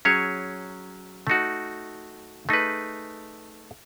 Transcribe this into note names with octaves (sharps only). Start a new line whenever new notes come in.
F#3 C#4 G#4 C#5
A3 D#4 F#4
A3 D#4 G#4 B4